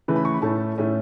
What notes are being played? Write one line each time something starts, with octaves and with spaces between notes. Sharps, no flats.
C#3 E3 A3 B4
B5
C#6
B5
A2 A3 C#4 A5
A2 A3 C#4